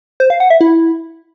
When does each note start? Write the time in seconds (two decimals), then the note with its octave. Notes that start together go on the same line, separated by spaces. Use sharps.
0.20 C5
0.30 F5
0.40 F#5
0.50 E5
0.61 E4